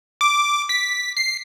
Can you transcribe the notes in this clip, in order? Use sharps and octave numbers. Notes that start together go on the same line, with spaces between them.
D6
B6
C7